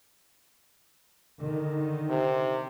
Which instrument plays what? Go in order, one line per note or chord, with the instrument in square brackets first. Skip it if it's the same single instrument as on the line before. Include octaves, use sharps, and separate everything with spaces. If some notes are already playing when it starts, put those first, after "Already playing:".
[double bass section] D3 D#3
[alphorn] C3